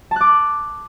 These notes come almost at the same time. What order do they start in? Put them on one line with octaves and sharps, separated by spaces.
A5 F#6 D6